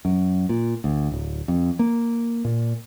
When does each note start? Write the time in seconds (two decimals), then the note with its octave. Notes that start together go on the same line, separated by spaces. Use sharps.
0.05 F#2
0.49 A#2
0.84 D2
1.12 D1
1.48 F2
1.79 A#3
2.45 A#2